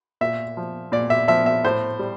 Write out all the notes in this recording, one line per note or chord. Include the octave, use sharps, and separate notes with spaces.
A#2 E5
F3
A#2 D5
E5
F3 E5
E5
A2 C5
G3